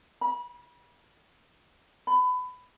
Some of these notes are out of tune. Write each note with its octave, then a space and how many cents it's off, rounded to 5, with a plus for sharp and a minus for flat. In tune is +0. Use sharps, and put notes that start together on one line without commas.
B5 -35
B5 +25